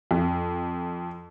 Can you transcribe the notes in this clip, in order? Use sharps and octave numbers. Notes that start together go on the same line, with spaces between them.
F2